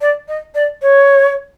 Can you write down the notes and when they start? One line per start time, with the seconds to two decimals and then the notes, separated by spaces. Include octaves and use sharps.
0.01 D5
0.28 D#5
0.55 D5
0.82 C#5